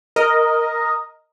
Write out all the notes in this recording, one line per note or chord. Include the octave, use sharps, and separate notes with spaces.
A#4 D#5